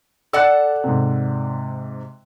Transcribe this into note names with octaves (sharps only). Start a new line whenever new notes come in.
A4 D5 F#5 E6 F#6
G#2 C3